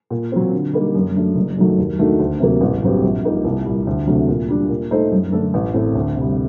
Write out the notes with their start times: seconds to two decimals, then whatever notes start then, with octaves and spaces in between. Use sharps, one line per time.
0.10 A#2
0.32 F#3 C4
0.53 D3
0.73 G3 A#3 D#4
0.95 F#2
1.16 F#3 A3 D4
1.36 F#1
1.57 F#2 D#3 F#3 A3
1.78 D#2
1.99 D#3 A3 D4 F#4
2.19 D2
2.40 C3 F#3 A#3
2.61 A1
2.83 G2 F#3 C4 G4
3.03 A#1
3.25 A#2 G3 A#3 D#4
3.45 C2
3.65 A#2 G3
3.87 D2
4.07 C3 F#3 A3 D4
4.29 A#2
4.48 G3 D4
4.69 A#2
4.91 A3 D#4 A4 C5
5.11 F#2
5.32 D3 A3 D4 A4
5.54 A1
5.74 A2 A3 C4
5.95 D2
6.16 C3 G3